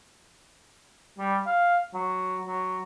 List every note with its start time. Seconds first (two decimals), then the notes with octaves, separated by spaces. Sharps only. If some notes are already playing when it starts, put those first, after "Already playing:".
1.19 G3
1.46 F5
1.94 F#3
2.47 F#3